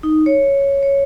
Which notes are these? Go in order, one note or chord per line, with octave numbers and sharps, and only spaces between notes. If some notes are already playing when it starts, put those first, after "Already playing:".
D#4
C#5
C#5